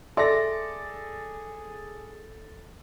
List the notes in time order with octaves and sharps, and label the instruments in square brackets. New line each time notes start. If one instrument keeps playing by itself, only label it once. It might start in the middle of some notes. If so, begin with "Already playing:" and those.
[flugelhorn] G#4 [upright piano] A4 A#6 [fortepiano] D5 [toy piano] E5 C6